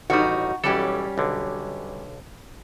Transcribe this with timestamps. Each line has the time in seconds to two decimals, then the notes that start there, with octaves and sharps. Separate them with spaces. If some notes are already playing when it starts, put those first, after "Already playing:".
0.10 A1 D#3 G3 D#4 F#4
0.64 B1 E3 G3 C#4 G4 A4
1.18 B1 D3